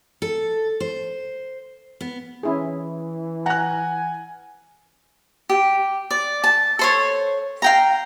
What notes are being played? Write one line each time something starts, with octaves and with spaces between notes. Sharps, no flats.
A4
C5
B3
E3 C#4 E4 G#4
F#5 G#5 A#5 F#6
G4
D5
A5
A4 C5 C#5
F5 G5 A#5